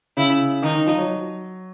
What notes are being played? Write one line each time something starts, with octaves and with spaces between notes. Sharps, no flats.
C#3 E4
D#3 D#4
D#3
F3
F#3